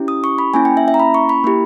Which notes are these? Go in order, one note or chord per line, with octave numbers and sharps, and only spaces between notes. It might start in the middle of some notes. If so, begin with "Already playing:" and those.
Already playing: C#4 E4 G4
D#6
C#6
B5
A#3 C#4 E4 G#5
G5
E5
E5
A#5
B5
C#6
B5
A#3 E4 G4